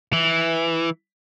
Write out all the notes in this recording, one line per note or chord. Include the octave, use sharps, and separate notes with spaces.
E3